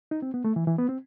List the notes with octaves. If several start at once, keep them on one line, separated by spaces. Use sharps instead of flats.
D#4
C4
B3
A3
E3
E3
B3
C4